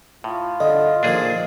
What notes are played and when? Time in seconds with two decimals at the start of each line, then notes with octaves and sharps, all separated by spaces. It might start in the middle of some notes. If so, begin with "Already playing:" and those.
0.24 A2 F4
0.60 D3 D#5
1.03 A#2 D#3 F3 D4 G#4